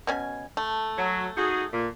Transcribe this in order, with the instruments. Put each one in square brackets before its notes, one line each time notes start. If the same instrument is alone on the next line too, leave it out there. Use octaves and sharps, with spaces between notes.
[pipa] B2 C#4 G#5
A3
[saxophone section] F#3
D#4 F#4 G#4
A#2